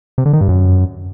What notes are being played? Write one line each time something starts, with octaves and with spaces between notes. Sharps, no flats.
C3
D3
D#3
G2
F#2